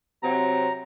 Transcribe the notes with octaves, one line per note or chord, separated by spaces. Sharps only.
C3 F#3 C4 A#5